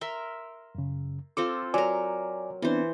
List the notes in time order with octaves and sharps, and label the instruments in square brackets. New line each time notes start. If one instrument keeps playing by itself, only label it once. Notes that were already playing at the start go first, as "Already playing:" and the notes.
[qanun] A#4 E5 C6
[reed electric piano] F#2 C#3
[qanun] C4 F4 A4 [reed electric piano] D6
[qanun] F#3 A#4 [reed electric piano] D5 G#5 D6
[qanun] E3 C5 [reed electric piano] B3 C4 D4